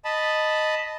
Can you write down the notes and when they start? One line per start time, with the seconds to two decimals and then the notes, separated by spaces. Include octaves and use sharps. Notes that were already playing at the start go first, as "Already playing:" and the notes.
0.05 D#5 A5 B5